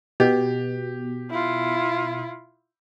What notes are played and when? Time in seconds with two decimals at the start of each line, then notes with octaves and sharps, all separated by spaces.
0.20 B2 G4
1.30 E4 F4